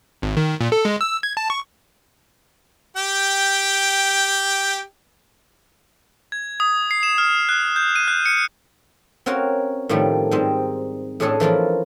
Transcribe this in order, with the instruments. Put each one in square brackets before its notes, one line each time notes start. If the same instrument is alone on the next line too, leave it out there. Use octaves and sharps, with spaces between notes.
[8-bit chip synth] G#1
D#3
A#2
A4
G#3
E6
G#6
A5
C#6
[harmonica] G4 G5
[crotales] G#6
D#6
C7
E7
F6
F#6
G6
D#7
F#6
C#7
[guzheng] C4 C#4 F#4 A#4 F5
A2 D#3 F3 G3 A3
G#2 G3 G#3 C4
A2 G#3 C#4 D4 G#4 A4
E3 F3 A#3 F4